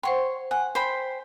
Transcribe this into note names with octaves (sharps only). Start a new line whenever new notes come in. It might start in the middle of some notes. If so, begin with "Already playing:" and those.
C5 C#5 F#5 G5 C6
F#5 G#5
C5 G5 B5